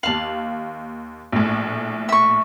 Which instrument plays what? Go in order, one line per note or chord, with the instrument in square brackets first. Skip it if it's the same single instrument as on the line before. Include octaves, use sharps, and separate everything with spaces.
[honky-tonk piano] D#2 F#7 [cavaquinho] F5 A5
[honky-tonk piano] A#1 A2
[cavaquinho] E5 C#6